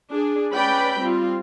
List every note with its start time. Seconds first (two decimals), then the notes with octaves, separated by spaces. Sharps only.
0.11 D4 G#4
0.54 C#4 B4 D5 G5 B5
1.00 G3 C4 F4